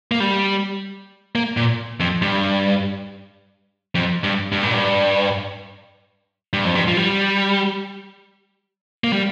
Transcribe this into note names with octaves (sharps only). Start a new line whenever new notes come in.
A#3
G3
A#3
A#2
F2
G2
F2
G2
G2
A#2
G2
G2
F2
G2
F3
G3
A#3
G3